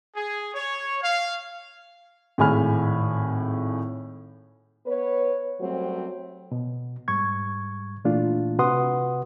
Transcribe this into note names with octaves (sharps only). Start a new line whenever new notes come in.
G#4
C#5
F5
G#1 A2 G#4 G#5 B5 F6
B3 B4 C#5
F#2 F#3 G3 A3 C4 C5
B2
G#2 G3 C#6 G#6
A#2 E3 A3 D4 F4
C3 F#4 B4 F#5 C6 D#6